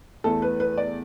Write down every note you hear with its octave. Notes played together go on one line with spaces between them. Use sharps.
E2 E3 A3 A4
B4
B4
D5